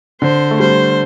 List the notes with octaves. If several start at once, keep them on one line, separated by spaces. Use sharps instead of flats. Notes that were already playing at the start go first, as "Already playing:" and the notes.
D3 C5
A3
G3 C5